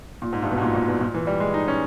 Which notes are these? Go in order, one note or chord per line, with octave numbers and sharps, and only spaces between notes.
A#2
G#2
G2
B2
G#2
A#2
A#2
B2
A#2
E3
G3
G#3
D#4
C#4